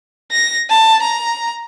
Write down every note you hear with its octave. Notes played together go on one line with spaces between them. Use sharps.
A#6
A5
A#5